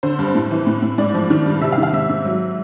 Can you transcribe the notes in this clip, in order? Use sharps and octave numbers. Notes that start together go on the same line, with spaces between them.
D3 C5
G2
A2
E3
A2
A2
G#2 D5
F3
D#3
G2
C3 E5
F5
D#3
F5
G#2 E5
G#2
F#3